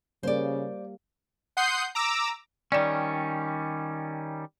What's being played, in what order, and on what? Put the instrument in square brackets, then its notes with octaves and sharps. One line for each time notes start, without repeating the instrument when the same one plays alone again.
[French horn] C#3 [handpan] G3 A#3 [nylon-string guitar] C5 D5
[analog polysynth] F#5 C6 D#6 G6 C7
A#5 D6 E6
[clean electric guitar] D#3 G3 C#4 [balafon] D5 G#5